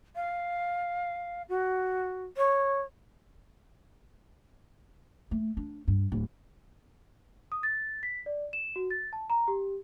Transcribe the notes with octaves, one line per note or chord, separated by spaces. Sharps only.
F5
F#4
C#5
A3
D4
G2
D1
D#6
A6
B6
D5
E7
F#4
A6
A5
A#5
G4